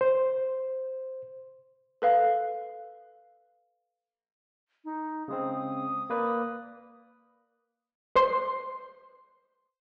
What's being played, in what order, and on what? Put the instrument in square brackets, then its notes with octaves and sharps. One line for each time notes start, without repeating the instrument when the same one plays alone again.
[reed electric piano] C5
[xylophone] A4 B4 F5
[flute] D#4
[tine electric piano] C#3 G#3 C4 [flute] D#6
[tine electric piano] A#3 B4 D5
[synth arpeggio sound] B4 C5 C6